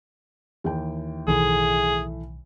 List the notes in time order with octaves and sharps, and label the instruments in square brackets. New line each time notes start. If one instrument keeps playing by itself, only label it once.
[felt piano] D#2 E3 G5
[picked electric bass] B1 D#3 [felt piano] A2 E3 A3 [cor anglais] G#4